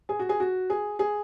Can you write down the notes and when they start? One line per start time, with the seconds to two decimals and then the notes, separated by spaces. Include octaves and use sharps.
0.09 G#4
0.19 F#4
0.29 G#4
0.40 F#4
0.70 G#4
0.99 G#4